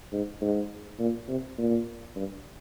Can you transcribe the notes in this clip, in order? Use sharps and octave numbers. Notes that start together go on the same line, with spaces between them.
G#2
G#2
A#2
C3
A#2
G2